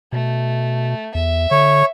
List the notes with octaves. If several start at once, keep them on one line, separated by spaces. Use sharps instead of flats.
B2 A3
E2 E5
D3 C#5